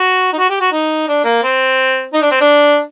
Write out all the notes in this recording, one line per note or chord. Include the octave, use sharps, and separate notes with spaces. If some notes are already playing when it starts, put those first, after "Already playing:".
Already playing: F#4
D#4
F#4
G4
F#4
D#4
D4
A#3
C4
D#4
D4
C4
D4